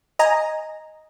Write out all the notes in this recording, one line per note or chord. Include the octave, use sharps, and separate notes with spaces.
D#5 G#5 A#5